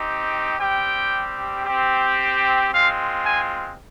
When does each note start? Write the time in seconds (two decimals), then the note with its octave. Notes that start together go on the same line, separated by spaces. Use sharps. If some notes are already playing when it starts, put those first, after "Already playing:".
Already playing: C4 D#4 G4
0.58 G3 C4 G4 G5
1.65 C4 G4
2.71 G#3 C4 F4 F5
3.25 G#5